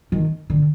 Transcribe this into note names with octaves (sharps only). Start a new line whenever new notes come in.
D#3
D3